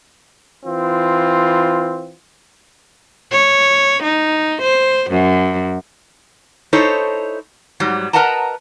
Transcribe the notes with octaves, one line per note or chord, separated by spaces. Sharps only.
E3 C4 F4
C#5
D#4
C5
F#2
D#4 E4 A4 C5 C#5
G#2 F#3 G3
A#4 B4 D#5 F#5 A5 A#5